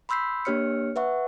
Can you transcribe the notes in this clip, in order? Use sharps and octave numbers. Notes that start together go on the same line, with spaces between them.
B5 C6 E6 G6 B6 C7
A#3 D4 G4 C#5 F6 C#7
B4 E5 F#5 C#6